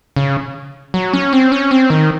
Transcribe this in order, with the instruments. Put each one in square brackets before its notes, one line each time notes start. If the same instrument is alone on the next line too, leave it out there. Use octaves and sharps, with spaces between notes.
[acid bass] C#3
F#3
C#4
C4
C#4
C4
D#3